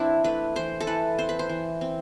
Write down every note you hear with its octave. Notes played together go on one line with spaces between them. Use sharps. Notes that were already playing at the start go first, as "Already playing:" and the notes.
Already playing: E3 C4 D4 E4
A3 B4
E3 C5
A4
E3 B4
C4 C5
B4
C5
E3
C4